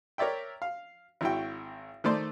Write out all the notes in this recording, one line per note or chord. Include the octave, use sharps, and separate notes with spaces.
A#4 C#5 D5 E5 G5
F5
G#1 E4 F#4 G5
D#3 A3 C5 D5 C6 D6